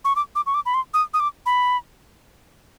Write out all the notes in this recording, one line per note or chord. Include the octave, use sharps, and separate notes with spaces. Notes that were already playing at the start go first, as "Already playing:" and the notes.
C#6
D6
D6
C#6
D6
B5
C6
D#6
D#6
D6
B5